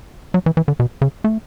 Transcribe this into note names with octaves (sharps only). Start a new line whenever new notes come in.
F#3
E3
E3
D3
B2
C#3
A3